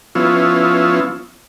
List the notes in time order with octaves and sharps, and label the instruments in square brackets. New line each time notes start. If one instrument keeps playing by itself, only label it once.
[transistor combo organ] F3 B3 C#4 E4 F4